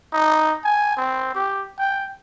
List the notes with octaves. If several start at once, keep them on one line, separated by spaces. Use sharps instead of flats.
D#4
G#5
C4
G4
G5